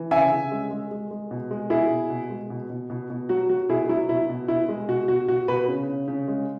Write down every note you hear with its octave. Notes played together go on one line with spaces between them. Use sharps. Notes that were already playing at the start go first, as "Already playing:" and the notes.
Already playing: E3
C#3 E5 G#5
C#3
G#3
G#3
G#3
G#3
B2
G#3
B2 E4 G#4
B2
B2
G#3
B2
B2
B2
B2
F#3 F#4
F#3 F#4
B2 E4 G#4
F#3 E4
B2 E4
B2
B2 E4
G#3
B2 F#4
B2 F#4
B2 F#4
B2 F#4 B4
C#3
C#3
C#3
G#3